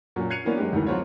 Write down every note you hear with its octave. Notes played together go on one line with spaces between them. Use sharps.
A#2 F#3 C#4
F#6 G#6 C7 C#7 D#7 F7
E3 A#3 B3 C#4 D4
F#3 G#3 G4
D2 G#2 D#3 E3
F#3 B3 C4 F4 C#5